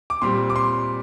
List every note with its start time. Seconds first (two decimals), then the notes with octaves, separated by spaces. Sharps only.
0.10 D6
0.22 A#2 G3 C4 C6
0.50 D6
0.56 C6